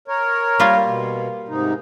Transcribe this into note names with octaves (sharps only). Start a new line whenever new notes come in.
A#4 C#5
G3 A#3 F4
B2
G#2 C3 D#4